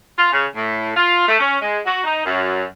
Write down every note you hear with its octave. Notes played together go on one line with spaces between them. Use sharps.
F4
C#3
A2
F4
A3
C#4
G#3
F#4
D#4
F#2